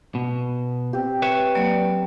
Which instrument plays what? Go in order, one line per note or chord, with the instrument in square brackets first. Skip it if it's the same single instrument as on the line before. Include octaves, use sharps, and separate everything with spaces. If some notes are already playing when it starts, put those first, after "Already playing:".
[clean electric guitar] B2
[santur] C4 G4
[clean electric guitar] B4 C#5 E5
[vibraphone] F#3 A#3 D5